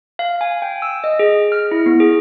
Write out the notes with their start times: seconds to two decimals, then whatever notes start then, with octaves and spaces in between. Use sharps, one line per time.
0.19 F5
0.41 G#5
0.62 G5
0.82 E6
1.04 D#5
1.19 G#4
1.52 F6
1.71 E4
1.86 B3
2.00 G#4